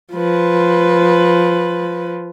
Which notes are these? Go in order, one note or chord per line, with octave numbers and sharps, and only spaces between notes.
F3 B4